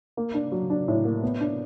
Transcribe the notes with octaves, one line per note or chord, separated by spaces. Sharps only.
A#3
D4
F#3
D4
A2
A#3
B3
D4